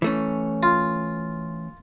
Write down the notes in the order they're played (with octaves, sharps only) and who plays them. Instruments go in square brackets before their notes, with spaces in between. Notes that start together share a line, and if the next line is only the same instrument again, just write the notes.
[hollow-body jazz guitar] E3 A3 C#4
[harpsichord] F4